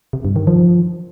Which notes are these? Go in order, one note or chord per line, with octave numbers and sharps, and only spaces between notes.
C3
G2
D#3
F3